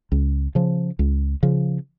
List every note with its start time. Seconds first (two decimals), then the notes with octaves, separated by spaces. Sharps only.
0.12 C#2
0.55 C#3 F3
0.99 C#2
1.43 C#3 F3